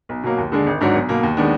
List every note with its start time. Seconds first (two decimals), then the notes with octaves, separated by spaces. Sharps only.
0.09 B1
0.23 B2 F#3 A#3
0.38 D#2
0.52 D3 G#3 D4 G#4
0.67 G#1
0.81 G#2 F#3 D4 F#4
0.95 B1
1.09 B2 A#3
1.23 D#2
1.37 D#3 G#3 B3 D4